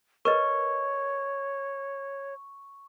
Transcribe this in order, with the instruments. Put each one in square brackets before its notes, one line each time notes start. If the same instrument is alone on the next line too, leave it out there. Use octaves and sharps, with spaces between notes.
[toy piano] A#4 B4 D#5 [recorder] C#5 [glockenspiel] C#6